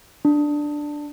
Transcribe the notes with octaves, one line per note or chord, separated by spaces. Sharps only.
D4